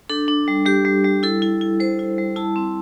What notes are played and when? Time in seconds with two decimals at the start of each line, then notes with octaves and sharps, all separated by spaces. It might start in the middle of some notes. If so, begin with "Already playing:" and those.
0.09 D4 A4
0.28 D4
0.48 G3
0.66 G3 G4
0.85 G3
1.04 G3
1.23 E4 A4
1.42 E4
1.61 E4
1.80 G3 C5
1.99 E4
2.18 G3
2.36 E4 A5
2.56 C4